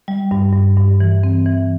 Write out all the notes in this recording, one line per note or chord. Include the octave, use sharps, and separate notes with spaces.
G3
G2
G2
G2
E3
C4
E3